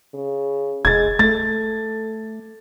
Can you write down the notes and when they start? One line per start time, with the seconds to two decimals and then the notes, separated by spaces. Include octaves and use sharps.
0.14 C#3
0.85 F1 G#3 G#6 A6
1.19 A3 A4 A6